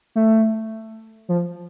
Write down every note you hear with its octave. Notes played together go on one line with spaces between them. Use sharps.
A3
F3